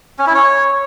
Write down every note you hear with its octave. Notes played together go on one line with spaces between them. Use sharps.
C#4
E4
C#5